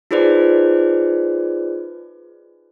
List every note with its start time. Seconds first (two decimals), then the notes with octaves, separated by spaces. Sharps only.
0.11 D#4 F4 G#4 B4 C5 D5